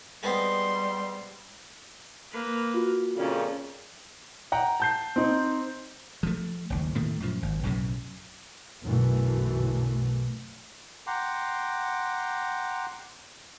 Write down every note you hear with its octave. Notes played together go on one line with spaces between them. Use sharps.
G3 G#3 B3 C4 C6
A#3 B4
F4 F#4
F2 A#2 C#3 C#4
F#5 G5 A#5
A5 G6 C7
C4 D#4
F3 A3
F#1 D#2
A2 D#3 A3
F#2 A#2 F3
G#1
B1 F#2 A2 C#3
B1 F#2 B2 D3 E3 A3
F#5 G5 A#5 C6 D6